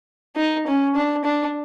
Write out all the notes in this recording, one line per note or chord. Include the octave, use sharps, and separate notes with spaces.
D#4
C#4
D4
D4